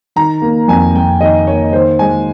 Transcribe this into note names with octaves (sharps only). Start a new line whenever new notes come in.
D#3 A#5
A#3
F2 G#5
F2 G5
D#3 D#5
A#3 C#5
D#3 C5
G#3 G#5